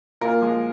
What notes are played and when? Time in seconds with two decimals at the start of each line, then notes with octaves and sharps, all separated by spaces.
0.21 A#2 F4 A#4
0.41 F3 G#3